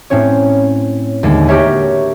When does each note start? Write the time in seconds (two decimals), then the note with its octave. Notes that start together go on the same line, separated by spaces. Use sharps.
0.10 A2 C4 C#4 C#5
1.23 D#2 D3 G#3 A3
1.48 F#4 G4 A#4 C#5 E5